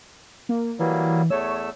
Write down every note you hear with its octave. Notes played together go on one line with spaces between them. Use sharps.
A#3
E3 F#3 G3 A#3
E2 A3 C#5 E6